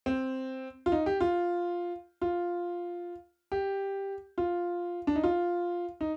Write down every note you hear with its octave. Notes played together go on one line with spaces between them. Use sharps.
C4
F4
D#4
G4
F4
F4
G4
F4
D4
D#4
F4
D#4